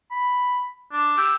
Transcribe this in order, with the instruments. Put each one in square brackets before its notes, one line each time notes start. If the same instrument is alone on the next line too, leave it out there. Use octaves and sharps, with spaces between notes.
[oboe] B5
D4
[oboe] G4 [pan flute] E6